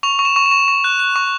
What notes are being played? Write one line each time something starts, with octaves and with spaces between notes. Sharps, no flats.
C#6 F7
C#6
E7
C#6
E7
C#6
C#6
F#6
F#6
C#6